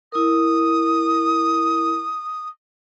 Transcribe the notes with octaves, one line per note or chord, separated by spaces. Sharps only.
E4 A#4 D#6